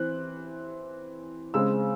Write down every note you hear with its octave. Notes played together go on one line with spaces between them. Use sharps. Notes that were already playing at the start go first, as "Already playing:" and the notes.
Already playing: E3 C4 F#6
C#3 G#3 C4 E6